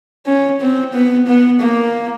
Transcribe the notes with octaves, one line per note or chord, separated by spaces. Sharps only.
C#4
C4
B3
B3
A#3